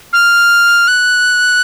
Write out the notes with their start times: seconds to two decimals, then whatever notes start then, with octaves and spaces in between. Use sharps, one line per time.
0.13 F6
0.88 F#6